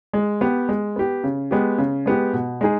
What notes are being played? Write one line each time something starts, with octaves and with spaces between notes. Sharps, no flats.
G#3
B3 G4
G#3
B3 G4
C#3
G#3 B3 G4
C#3
G#3 B3 G4
B2
G#3 D#4 G#4